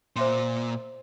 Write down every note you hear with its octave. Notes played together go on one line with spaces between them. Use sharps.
A#2 C5 E5 C6